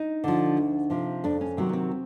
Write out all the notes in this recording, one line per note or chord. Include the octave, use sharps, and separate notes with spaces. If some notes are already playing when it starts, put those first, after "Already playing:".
Already playing: D#4
D3 F3
D2
C3 F3
F2 D4
C#4
C3 D#3 F#3 C4
B3
C4